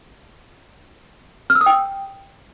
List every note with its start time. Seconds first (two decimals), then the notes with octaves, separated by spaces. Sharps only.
1.50 F6
1.55 E6
1.61 D#6
1.66 G5